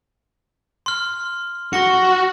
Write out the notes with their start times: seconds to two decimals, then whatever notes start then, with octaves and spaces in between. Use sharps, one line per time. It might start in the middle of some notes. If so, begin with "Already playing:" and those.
0.86 C6 F6
1.73 F#4 C#6 A#6 C#7